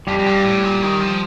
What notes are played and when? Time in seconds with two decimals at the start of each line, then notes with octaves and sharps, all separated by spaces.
0.07 F2 G3 G4
0.19 F2
0.26 G2
0.45 A2
0.63 A#2
0.82 D#3
1.00 F3